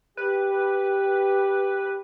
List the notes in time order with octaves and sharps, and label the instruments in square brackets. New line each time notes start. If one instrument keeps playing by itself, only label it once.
[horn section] G4 [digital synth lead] B4